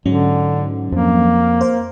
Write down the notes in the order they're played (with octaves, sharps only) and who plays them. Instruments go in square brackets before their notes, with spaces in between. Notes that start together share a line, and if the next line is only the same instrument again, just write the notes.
[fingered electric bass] G#2 [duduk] D3 [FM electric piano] F#3 C#4
[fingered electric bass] F2 F3 C4 [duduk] A#3
[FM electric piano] C5 F5